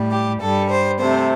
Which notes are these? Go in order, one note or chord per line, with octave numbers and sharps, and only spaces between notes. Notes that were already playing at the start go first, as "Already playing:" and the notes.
Already playing: A2 G3
G4
G2 G3 A4
C5
C3 A3 C5